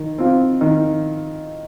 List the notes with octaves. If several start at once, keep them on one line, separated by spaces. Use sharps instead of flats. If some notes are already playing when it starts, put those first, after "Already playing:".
Already playing: D#3
C4 F4
D#3